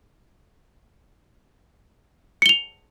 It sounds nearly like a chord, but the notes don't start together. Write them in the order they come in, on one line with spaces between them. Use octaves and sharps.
C#7 G7 F7